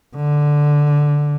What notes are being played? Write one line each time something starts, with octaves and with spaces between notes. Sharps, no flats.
D3